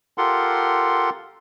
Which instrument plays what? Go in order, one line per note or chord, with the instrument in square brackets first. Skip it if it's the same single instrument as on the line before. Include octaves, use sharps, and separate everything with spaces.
[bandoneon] F4 G4 A4 A#4 F#5 C6